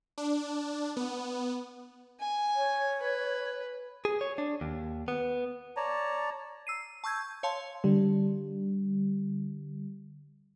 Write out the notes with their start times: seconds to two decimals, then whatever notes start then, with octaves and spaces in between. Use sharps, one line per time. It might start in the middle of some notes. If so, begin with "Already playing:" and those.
0.18 D4
0.97 B3
2.20 G#5
2.56 C#5
3.00 B4
4.05 G#4
4.21 C#5
4.38 D4
4.61 D#2
5.08 B3
5.76 C#5 D5 A5 A#5
6.67 E6 C7 D#7
7.04 A5 C#6 E6 G6 G#6
7.43 C#5 F5 A5 C6
7.84 D3 G3